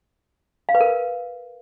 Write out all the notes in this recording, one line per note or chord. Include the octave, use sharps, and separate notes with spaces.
F5
B4
A#4